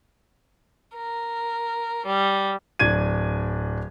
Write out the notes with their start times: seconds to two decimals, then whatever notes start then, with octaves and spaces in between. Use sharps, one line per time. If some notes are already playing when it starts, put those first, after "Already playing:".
0.97 A#4
2.06 G3
2.79 D1 D4 G#6 D#7